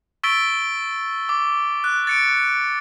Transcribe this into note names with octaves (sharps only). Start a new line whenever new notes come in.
C#6 E6 A6 B6 D7 G7
D6
F#6
A6 C#7 D7